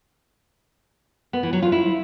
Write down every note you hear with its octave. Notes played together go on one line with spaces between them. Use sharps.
B3
E3
F#3
F4
E4